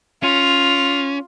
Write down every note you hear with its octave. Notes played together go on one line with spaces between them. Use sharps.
C#4 F4